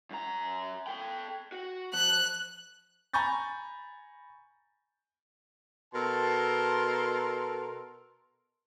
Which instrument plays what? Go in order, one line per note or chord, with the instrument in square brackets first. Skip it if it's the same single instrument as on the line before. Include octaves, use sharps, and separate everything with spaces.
[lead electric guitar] F#2 A#5
A4 G5
F#4
[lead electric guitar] F3 [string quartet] F#6
[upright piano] G#5 A#5 B5 C#6 G6 A6
[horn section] B2 A4 A#4 A5 C6